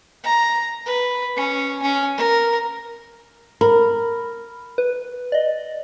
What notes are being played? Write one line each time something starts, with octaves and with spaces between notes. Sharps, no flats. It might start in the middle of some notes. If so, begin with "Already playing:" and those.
A#5
B4
C#4
C#4
A#4
A#4 B5
B4
D5 D#5